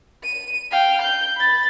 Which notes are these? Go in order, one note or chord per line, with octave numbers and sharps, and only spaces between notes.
D#7
F5 G5
G6
B5 A6